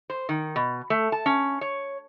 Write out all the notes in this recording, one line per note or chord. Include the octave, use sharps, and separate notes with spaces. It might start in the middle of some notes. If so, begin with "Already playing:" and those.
C5
D#3
B2
A3
A5
C#4
C#5